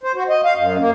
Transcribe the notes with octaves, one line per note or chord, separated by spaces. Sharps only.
C5
F#4
D#5
F5
F#2
A#3